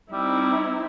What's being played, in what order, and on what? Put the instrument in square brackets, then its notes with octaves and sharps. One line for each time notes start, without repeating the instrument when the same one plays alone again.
[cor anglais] G3 [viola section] C4 D#4 E4